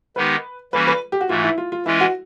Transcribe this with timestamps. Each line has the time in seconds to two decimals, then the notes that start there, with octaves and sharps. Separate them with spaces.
0.16 D#3 G#3 B3 D#4 G4 B4
0.73 E3 G3 A#3 C#4 F#4 B4
0.87 B4
1.12 G4
1.21 F#4
1.29 G#2 E3 A3 F4
1.44 E4
1.58 F4
1.72 F4
1.86 E3 G#3 C#4 E4 F4
2.01 F#4